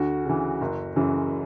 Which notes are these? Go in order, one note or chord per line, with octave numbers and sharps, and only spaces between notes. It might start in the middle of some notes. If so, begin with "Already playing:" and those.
Already playing: D2 F#4
C#3 E3
F#1
F#2 C#3 E3